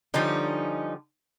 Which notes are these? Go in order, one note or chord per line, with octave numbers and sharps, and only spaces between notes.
D3 F3 G3 C#4 D#4